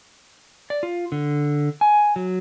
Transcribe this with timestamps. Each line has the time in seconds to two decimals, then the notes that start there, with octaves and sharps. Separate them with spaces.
0.70 D5
0.83 F4
1.12 D3
1.81 G#5
2.16 F#3